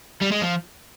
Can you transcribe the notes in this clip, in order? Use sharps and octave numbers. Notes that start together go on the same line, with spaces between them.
G3
G#3
F3